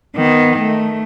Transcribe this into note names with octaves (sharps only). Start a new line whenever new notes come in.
D#3 B3
A3